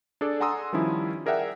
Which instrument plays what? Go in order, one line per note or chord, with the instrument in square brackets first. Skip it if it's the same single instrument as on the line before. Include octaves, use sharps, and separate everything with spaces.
[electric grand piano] D4 G#4 A4 D5
F#5 G#5 A#5 C6 D#6 E6
D#3 F3 G3 C#4 E4
G#4 A#4 D5 E5 F#5 G5